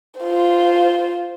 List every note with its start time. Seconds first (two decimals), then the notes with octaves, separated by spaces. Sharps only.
0.20 F4 C5